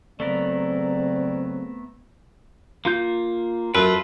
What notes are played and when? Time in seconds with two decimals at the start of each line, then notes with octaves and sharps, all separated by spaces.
0.20 C#3 F#3 A3 B3 C4 A#4 D5
2.85 A#3 F4 G6
3.75 F#2 F4 A4 B4